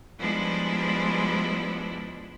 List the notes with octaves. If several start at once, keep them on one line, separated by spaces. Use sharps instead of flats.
F3 G3 G#3 B3 D4 E4